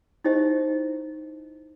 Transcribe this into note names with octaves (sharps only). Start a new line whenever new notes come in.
D#4 E4 G4 C5 D#5